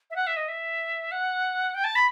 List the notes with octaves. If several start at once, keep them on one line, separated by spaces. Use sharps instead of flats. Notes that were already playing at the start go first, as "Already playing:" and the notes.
E5
F#5
E5
D#5
E5
F#5
G5
A5
B5